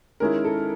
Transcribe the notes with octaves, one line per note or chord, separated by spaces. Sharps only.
D#3 G#3 C#4 E4 A#4
A4